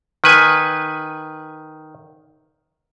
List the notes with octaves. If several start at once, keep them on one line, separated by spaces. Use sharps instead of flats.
D#3 B4 G#5